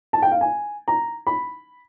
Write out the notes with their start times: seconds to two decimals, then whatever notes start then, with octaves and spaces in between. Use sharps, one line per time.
0.13 A5
0.22 G5
0.31 F5
0.41 G#5
0.88 A#5
1.27 B5